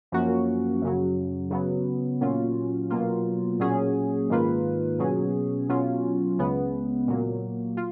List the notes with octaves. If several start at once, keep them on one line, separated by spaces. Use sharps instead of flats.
F#2 F3 A#3 C#4 F#4
F#2 C#3 F#3
C#3 F#3 B3
A#2 F#3 C#4 F4
B2 F#3 A#3 F4
A#2 F#3 C#4 G#4
G#2 D#3 A#3 F4 B4
B2 F#3 C#4 G#4
B2 F#3 C#4 F4
C#2 C#3 G#3 B3
A#2 F#3 A#3
F4